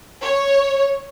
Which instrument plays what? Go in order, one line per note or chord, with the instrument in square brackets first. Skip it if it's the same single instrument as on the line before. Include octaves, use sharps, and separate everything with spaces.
[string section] C#5